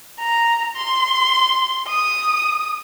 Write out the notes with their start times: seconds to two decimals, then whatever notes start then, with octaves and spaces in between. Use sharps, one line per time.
0.19 A#5
0.76 C6
1.88 D#6